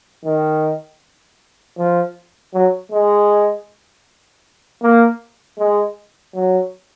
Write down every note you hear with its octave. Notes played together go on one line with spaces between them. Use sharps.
D#3
F3
F#3
G#3
A#3
G#3
F#3